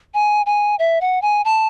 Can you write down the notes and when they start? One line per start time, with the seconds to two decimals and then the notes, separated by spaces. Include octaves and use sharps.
0.14 G#5
0.46 G#5
0.79 E5
1.01 F#5
1.22 G#5
1.45 A5